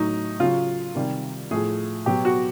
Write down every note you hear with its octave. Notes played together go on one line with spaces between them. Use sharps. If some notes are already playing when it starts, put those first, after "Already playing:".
Already playing: A2 F#3 D#4
C#3 F#3 F4
C3 D#3 G3
A2 F3 G#4
B2 F#3 G4
F#4